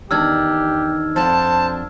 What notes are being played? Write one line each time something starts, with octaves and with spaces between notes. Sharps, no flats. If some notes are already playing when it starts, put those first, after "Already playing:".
E2 D#3 D4 G4 E6 F6 G#6
F2 D4 C5 F#5 A5